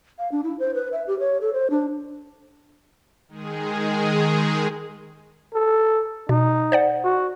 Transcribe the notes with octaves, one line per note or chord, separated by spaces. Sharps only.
F5
D4
E4
C5
B4
E5
G4
C#5
A4
C5
D4
D#3 G#3 G#4
A4
B2 D#4
C5 D5 F#5
F#4